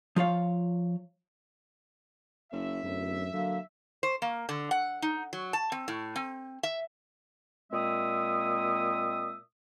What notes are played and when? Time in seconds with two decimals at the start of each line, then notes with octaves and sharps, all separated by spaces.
0.16 F3 F4 C#5 F5
2.52 F#1 E5
2.84 D1 F#2
3.33 D3 F#3 A#3
4.03 C5
4.22 A#3
4.49 D3
4.71 F#5
5.02 D#4
5.33 F#3
5.53 A5
5.72 C4
5.88 A2
6.16 C4
6.63 E5
7.72 A#2 G#3 C4 E5 D#6